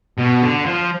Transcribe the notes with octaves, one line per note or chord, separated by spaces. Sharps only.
B2
D3
F3